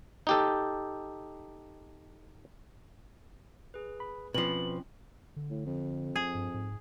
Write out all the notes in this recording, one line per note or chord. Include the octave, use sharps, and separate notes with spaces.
D#4 G4 A4
G#4 B4
B5
B2 F3 C4 C#4 F4 B4 B5 F#7
D3
A2
F2
G#4
G2
G#2